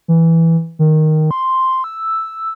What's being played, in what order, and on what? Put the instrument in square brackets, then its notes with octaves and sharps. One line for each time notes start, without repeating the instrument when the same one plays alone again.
[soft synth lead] E3
D#3
C6
E6